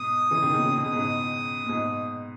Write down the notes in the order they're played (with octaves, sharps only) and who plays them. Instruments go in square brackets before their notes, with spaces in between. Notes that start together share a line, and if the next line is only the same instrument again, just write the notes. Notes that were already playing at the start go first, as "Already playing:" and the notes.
Already playing: [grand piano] G#2 B2 [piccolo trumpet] D#6
[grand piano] C#3 E3
B2 D#3
A#2 C#3
[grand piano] B2 [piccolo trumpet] D#6
[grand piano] C#3
G#2 B2
A#2
G#2 B2